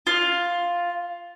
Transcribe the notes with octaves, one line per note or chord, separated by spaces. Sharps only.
F4